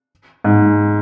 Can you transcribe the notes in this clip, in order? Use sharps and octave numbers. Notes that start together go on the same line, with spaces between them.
G#2